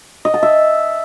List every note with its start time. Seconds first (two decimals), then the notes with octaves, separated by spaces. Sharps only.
0.25 D#5
0.34 A5
0.43 E5